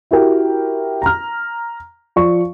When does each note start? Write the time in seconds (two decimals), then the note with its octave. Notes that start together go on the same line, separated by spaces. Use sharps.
0.11 E4 F#4 G4 A#4 G5
1.02 A#5 F6
2.16 F3 D5 C#6